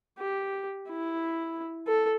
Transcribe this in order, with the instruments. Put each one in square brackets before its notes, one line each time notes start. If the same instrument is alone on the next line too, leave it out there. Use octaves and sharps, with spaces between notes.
[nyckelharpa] G4
E4
A4